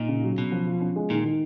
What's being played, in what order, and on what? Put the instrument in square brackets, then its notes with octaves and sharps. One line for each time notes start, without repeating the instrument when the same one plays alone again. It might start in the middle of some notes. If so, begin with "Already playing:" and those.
Already playing: [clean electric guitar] A#2 [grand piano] D#4
[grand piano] C#3
F#3
[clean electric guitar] B2 [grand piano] C#4
[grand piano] F3
F4
C#4
G#3
[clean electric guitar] A#2 [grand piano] D#3
[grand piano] D#3